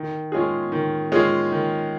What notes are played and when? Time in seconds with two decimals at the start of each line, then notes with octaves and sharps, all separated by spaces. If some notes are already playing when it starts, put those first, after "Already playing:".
Already playing: D#3
0.32 G#3 C#4 F4 G#4
0.72 D#3
1.12 G#3 C#4 F4 G#4
1.51 D#3